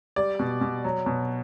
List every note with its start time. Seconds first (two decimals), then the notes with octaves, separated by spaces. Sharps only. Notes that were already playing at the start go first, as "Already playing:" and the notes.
0.16 G3 D5
0.39 B2
0.61 B2
0.84 F#3
1.06 B2